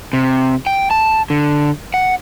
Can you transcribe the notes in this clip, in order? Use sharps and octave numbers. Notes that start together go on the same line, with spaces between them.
C3
G5
A5
D3
F#5